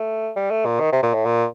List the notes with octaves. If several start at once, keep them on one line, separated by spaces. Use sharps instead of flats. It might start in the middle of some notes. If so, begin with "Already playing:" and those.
Already playing: A3
G3
A3
A#2
D#3
C3
A#2
A2
A#2